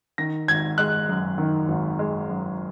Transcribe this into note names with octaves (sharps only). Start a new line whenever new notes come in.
D#3 A#6
G#1 G#6
G#3 F#6
F#2
D#3
G#1
G#3
F#2